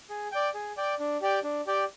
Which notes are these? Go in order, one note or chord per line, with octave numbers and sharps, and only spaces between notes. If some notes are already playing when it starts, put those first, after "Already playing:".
G#4
D5 G5
G#4
D5 G5
D4
G4 D5 G5
D4
G4 D5 G5